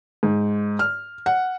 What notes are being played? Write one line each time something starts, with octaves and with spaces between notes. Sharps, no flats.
G#2
F6
F#5